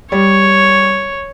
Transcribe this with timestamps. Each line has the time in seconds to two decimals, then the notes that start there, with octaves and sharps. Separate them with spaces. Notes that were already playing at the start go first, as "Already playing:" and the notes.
0.12 G3 C#5